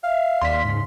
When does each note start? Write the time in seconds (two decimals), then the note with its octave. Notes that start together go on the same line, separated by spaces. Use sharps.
0.04 E5 F5
0.41 D#2 D5 C6 B6
0.65 G#2 C#3